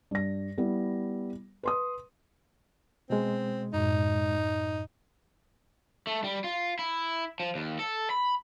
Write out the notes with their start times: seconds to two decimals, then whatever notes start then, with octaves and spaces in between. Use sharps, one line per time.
0.11 G2 A#6
0.58 G3 B3 E4
1.63 B4 C6 D#6
3.10 B2 G#3 C4
3.73 F#2 A2 D#4
6.07 A3
6.24 G3
6.44 F4
6.79 E4
7.40 F3
7.55 D#2
7.79 A4
8.10 B5